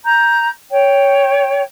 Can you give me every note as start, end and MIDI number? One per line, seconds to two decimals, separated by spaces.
0.04 0.48 82
0.04 0.48 91
0.71 1.62 73
0.71 1.62 79